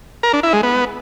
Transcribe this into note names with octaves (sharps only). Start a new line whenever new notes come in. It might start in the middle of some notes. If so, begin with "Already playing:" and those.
A#4
D4
E4
G#3
B3